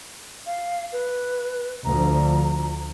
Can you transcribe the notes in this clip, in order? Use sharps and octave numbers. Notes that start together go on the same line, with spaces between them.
F5
B4
D2 D3 F3 A#5